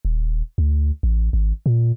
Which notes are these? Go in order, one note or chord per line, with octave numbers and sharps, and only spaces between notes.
D#1
D2
A1
G#1
A#2